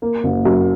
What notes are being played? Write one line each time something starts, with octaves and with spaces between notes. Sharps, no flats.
A#3
F#1
F#2